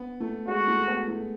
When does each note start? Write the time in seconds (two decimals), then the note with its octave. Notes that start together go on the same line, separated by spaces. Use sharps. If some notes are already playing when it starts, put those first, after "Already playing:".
Already playing: B3
0.20 A3
0.47 G#3 F#4
0.68 A3
0.88 B3
1.08 A3